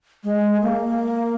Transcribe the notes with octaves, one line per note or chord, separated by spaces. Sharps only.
G#3
A#3